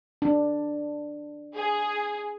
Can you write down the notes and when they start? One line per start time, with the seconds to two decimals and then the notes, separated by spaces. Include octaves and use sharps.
0.22 D4
1.55 G#4